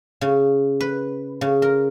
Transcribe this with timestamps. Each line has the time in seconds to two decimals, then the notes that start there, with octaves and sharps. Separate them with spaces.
0.21 C#3
0.81 B4
1.41 C#3
1.62 A#4